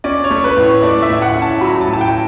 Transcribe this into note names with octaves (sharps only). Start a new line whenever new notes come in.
C#4 D5
C#5
A3
B4
A2
C#5
A3 D5
E5
A2
F#5
C#4
A5
F#3 B5
A5
A2
A5
G5